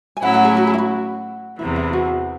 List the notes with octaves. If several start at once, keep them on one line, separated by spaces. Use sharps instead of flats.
G#5
A2 F#3 C#4 E4 F#5
F#5
G#4
F#4
G#4
E4
F#4
E2 C3 E3 E4
E4
F#4